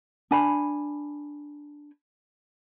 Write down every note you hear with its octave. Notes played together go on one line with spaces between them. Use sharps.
D4 G#5 B5